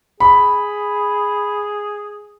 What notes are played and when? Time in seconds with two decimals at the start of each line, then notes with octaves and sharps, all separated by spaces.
0.20 G#4 B5